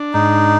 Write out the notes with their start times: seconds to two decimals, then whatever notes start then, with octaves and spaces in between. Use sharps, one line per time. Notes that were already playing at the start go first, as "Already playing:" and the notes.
Already playing: D4
0.13 G#2 D#4